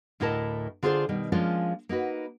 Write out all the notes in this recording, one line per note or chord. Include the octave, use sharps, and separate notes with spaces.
D2 A2 E4 A#4 D#5 A5
D3 F4 G#4 A#4 C5 D5
B2 D#3 G3
F3 G#3 A#3 C#4 D4 F4
A#3 D#4 F#4 B4